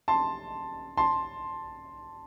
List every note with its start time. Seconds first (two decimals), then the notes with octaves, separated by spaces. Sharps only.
0.08 A5 C6
0.97 A5 C6